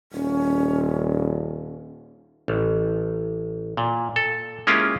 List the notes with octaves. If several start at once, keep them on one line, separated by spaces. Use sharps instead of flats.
D#1 C#4
A1
A#2
A4
G#3 A#3 C#4 E4 F4 G4